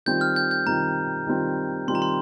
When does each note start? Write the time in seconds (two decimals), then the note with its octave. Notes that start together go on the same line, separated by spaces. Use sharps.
0.06 D#3 G3 C4 F4 G6
0.21 F6
0.36 G6
0.51 G6
0.67 D#3 G3 C4 F4 A#5
1.27 D#3 G3 C4 F4
1.88 D#3 G3 C4 F4 C6
1.95 A#5
2.02 C6